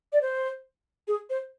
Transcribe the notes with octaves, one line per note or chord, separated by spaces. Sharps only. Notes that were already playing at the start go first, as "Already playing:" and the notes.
D5
C5
G#4
C5